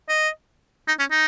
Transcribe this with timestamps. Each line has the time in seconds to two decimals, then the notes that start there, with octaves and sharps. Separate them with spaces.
0.09 D#5
0.88 D#4
0.99 C#4
1.11 D#4